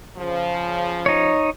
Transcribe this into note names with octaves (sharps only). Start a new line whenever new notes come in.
C#3 F3
D#4 C#5